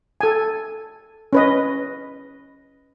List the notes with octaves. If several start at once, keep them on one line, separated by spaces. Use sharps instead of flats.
A4 G#5
C#4 B4 D#5